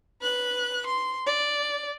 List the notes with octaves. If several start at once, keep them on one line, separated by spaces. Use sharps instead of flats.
B4 F#6
C6
D5